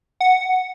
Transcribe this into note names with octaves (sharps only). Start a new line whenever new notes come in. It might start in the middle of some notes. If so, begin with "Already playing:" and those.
F#5